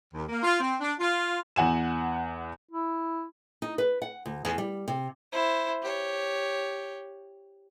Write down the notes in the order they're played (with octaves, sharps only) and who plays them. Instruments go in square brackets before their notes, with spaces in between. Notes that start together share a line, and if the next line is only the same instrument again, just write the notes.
[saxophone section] D#2
A#3
F4
C4
D4
F4
[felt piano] E2 F#5 G#5 E7
[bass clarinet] E4
[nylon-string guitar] D#4
B4
F#5
D2
E2
G3
C3
[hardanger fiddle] E4 C5
G4 C#5